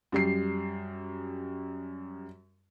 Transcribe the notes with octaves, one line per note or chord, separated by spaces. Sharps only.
F#2 G3 C7